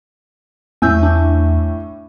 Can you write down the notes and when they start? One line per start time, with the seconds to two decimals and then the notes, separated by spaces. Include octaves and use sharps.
0.82 E2 A2 G#5 E6 G6
1.03 D4